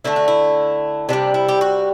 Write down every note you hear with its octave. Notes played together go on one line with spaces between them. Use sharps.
D3 A3 E4
F#4
E4
C3 E3 G3 D4
E4
G4
F#4